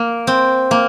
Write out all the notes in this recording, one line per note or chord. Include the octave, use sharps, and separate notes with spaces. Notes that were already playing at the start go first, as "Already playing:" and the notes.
Already playing: A#3
C4
A#3